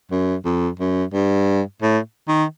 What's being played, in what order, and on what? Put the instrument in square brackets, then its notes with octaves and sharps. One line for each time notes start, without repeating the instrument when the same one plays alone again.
[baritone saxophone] F#2
F2
F#2
G2
A2
D#3